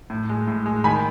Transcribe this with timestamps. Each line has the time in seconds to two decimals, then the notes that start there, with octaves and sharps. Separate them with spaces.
0.10 A2
0.29 G#3
0.48 A2
0.66 G#3
0.84 D#3 G#5 B5